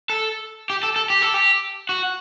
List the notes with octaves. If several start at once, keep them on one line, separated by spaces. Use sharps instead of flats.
A4
G4
A4
A4
G4
A4
G4
F#4